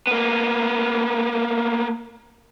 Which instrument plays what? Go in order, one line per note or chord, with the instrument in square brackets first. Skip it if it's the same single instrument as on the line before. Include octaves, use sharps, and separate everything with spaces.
[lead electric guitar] A#3 B3